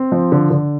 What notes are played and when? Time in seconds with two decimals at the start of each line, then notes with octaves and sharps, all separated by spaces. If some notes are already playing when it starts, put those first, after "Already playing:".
Already playing: C4
0.12 F3
0.32 D3
0.51 D3